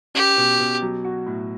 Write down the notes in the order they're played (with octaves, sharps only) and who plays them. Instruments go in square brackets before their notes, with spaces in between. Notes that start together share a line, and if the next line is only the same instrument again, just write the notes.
[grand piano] C#4 [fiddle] G4
[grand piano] B2
B2
F#3
F#4
A2